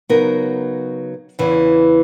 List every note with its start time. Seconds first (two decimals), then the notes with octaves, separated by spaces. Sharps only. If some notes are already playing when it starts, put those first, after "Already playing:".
0.09 C#3 F#3 B3 D#4 A#4
1.39 E2 C#3 E3